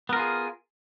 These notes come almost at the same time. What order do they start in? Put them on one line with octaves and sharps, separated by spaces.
B3 A#4 F4 G#4